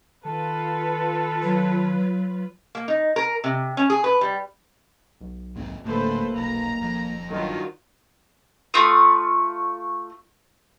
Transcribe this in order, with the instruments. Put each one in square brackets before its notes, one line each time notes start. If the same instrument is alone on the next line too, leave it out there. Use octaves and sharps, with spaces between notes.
[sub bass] D#3 [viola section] F4 B4 [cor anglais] A4
[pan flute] F#3
[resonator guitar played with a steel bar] A#3
D#4
A#4
C3
C#4
G#4
B4
G3
[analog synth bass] B1
[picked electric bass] D#2 G#2 C4
[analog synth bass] D#1 [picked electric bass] A2 D3 [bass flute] A#3 [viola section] A4 B4 C5
[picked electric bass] B1 [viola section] A#5
[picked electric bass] F2
[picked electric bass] G2 [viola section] D#3 F#3 F4
[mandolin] A3 F4 D#6